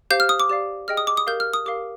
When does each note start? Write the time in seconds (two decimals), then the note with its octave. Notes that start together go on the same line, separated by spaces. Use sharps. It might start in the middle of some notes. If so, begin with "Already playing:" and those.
0.10 G4 C5 F5 G6
0.20 F6
0.29 D#6
0.40 D6
0.49 G4 D5 F5
0.88 G#4 D#5 G5 F6
0.97 D#6
1.07 D6
1.17 D#6
1.27 G4 A#4 F5 G6
1.40 F6
1.54 D#6
1.66 G4 A#4 F5 D6